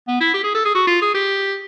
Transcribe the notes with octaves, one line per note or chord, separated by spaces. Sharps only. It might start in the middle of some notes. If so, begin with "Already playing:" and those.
B3
E4
G4
G#4
A4
G#4
F#4
F4
G#4
G4